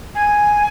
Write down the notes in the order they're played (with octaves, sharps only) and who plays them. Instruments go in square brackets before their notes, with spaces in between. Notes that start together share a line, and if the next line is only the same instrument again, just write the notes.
[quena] G#5